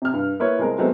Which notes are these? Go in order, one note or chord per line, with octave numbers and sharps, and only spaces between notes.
C3 F6
G2
A#3 E4 B4 C#5
C2 G#3 C4 A#4
F#3 G#3 A3 B3 C4 D#4